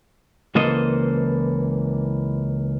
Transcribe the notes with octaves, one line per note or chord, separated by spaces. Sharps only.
C#2 E3 A#3 A4 C5 D#5